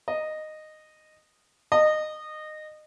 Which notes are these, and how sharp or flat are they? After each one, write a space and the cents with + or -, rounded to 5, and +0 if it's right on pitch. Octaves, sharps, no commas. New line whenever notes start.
D#5 -10
D#5 -20